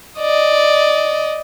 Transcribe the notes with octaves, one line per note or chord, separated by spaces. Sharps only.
D5 D#5